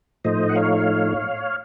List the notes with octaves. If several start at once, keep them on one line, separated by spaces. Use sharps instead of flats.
A2 F3 A3 D#4 C5 D#5
F#5
C#5 F5